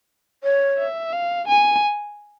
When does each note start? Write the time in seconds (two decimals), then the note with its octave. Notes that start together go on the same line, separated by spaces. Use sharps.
0.44 C#5
0.78 E5
1.13 F5
1.48 G#5